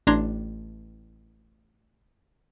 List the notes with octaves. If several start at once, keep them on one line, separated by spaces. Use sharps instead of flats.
A1 D4 A#5 C6 G#6 A#6